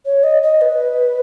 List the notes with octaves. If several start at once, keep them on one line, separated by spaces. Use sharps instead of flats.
C#5
D#5
D#5
B4